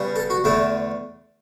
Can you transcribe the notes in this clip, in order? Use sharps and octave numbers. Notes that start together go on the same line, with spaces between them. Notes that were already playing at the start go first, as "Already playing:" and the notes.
Already playing: C#3 G3 B3
A4
F#4
E2 D3 A3 E4